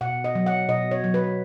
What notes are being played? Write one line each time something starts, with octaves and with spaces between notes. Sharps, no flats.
B2 F#5
D#5
F#3
F#5
B2 D#5
C#5
F#3
B4